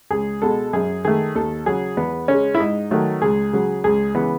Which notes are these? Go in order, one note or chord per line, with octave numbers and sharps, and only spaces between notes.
C#2 G#4
B2 G#3 A4
F#2 G#4
D#3 A3 G#4
D#2 A4
C#3 F#3 G#4
E2 B3
C#3 G#3 C#4
E4
G#2 D#4
D#3 F#3 A3
C#2 G#4
C#3 F#3
C#2 G#4
C#3 E3 B3